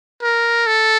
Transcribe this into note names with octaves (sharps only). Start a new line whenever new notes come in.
A#4
A4